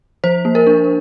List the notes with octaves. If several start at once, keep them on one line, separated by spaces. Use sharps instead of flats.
F3 C5
A#3
A#4
D4